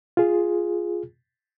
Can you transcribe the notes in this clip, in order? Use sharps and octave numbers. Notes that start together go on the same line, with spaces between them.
F4 G#4